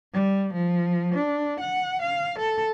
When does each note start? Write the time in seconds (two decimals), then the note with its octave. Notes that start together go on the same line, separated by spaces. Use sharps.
0.13 G3
0.54 F3
1.15 D4
1.60 F#5
2.02 F5
2.39 A4